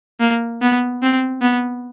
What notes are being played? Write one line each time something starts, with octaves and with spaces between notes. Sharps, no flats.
A#3
B3
C4
B3